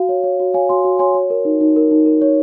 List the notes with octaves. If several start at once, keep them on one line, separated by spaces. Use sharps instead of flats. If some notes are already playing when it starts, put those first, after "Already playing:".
Already playing: F#4 F5
C#5
C#5
F#4
C#5 F5 G#5
F#4 G#5 C6
F#4
C#5 G#5 C6
C#5
A#4
D#4
D#4
A#4
D#4
A#4
C#5